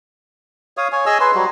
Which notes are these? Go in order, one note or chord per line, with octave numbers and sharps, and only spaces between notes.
C#5 F5 D#6
C#5 G#5
G#4 D#5 G#5 E6
B4 G#5 C6
F#3 G3 F#4